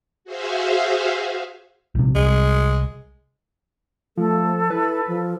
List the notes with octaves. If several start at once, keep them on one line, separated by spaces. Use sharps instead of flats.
F#4 G#4 C5 E5 F5
A#1 C3
C2 G#3
F3 A3 A4
E4 B4
F3